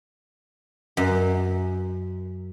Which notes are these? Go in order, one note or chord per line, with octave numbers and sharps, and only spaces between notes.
F#2